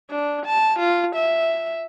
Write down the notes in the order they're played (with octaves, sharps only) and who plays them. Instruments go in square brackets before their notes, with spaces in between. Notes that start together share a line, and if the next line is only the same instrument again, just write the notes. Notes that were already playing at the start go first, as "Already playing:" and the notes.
[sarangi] D4
A5
F4
E5